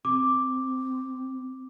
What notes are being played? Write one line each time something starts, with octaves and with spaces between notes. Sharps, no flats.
C4 D6